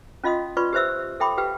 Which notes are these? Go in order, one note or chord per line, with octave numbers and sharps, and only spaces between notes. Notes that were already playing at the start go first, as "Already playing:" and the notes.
C#4 F4 D#5 F5 C6 D#6
F4 B4 D5 C6 C#6
G4 B4 C5 E5 E6
A4 E5 G5 B5 D6
G4 B4 F5 G5